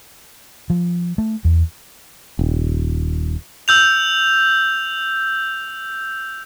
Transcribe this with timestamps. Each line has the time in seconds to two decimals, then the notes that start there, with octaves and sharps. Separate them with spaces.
0.70 F3
1.18 A3
1.45 E2
2.39 D#1
3.68 E6 G6 F7